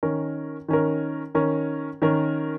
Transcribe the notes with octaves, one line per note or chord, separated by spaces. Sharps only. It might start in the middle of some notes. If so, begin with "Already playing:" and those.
D#3 C#4 A#4
D#3 C#4 A#4
D#3 C#4 A#4
D#3 C#4 A#4